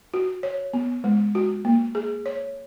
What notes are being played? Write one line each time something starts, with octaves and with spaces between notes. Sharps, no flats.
F#4
C#5
B3
G#3
F#4
A#3
G#4
C#5